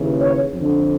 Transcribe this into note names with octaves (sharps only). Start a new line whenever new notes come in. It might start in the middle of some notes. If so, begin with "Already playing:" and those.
Already playing: D#2 C#3 E3
C#5
F2 D3